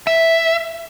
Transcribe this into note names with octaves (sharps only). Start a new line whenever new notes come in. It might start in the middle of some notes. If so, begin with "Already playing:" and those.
E5